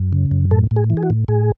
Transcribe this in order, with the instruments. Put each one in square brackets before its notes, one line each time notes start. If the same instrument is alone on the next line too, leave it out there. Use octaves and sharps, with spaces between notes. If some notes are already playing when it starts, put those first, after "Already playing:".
Already playing: [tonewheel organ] F#2
C#3
F#2
A2 A4
A2
G#4
E3
G#4
F#4
A2
A2 G#4